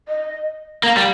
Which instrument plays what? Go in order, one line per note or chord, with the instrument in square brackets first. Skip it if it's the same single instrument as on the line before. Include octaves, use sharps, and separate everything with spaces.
[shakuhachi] D#5
[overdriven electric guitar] A#3 [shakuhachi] F5
[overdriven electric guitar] G3